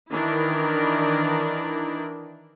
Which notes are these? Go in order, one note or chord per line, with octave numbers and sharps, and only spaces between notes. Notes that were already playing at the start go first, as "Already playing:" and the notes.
D#3 E3 D4 E4 A#4